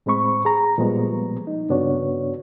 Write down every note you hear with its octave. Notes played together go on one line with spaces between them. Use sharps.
A2 G#3 C4 B5 C#6
G#4 A#5
A#2 F3 G3 G#3 B3
D#4
G2 C#3 B3 D4 F#4 C#5